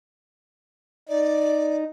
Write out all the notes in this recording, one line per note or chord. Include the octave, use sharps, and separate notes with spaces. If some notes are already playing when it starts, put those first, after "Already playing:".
D#4 D5